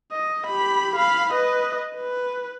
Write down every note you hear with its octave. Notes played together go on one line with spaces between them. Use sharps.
D#5
G4 B5
F5 B5
B4 D#5
B4